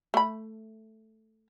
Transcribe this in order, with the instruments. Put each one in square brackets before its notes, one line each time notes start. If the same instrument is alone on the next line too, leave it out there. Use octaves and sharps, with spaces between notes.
[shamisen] A3 B5